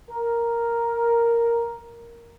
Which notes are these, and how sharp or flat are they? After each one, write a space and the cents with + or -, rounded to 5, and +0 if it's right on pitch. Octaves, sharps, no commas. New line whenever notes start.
A#4 +0